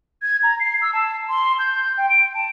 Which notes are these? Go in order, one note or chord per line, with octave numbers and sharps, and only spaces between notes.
G#6
A#5
C7
E6
A5
C6
G6
G5
D7
A5